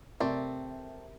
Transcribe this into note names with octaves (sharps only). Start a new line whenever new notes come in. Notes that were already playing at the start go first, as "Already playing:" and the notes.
C3 A3 C4 A#4 D5